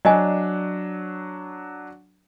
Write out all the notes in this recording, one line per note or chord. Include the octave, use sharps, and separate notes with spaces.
F#3 D4 D5 D#5 G#5